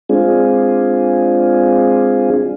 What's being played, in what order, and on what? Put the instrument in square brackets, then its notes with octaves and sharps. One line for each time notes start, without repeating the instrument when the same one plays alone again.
[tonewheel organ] G#3 C4 D4 F4 G#4